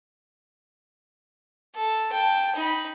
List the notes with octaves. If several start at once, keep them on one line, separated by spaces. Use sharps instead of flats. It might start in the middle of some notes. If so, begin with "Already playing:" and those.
A4
G5 A5
D#4 B5